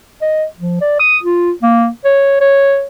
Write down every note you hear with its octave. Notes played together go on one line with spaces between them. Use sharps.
D#5
F3
D5
D#6
F4
A#3
C#5
C#5